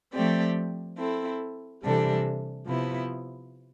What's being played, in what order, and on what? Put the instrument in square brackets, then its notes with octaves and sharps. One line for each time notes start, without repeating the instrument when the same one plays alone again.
[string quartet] F3 A3 C4 G4 D5
C4 E4 A4
C3 E3 G3 D4 A4
C3 F3 B3 E4